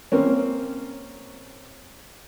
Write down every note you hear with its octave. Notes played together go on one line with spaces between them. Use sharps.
A#3 C4 C#4